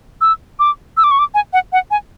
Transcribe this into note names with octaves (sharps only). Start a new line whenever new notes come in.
E6
D6
E6
D6
C#6
D6
G#5
F#5
F#5
G#5